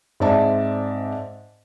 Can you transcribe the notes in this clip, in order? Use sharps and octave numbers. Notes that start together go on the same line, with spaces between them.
G#2 C4 D5 E5 A5